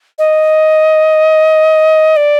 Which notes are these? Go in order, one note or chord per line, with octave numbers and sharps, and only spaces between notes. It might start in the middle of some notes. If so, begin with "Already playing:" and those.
D#5
D5